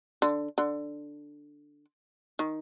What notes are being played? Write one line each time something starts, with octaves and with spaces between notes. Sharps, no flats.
D3
D3
D#3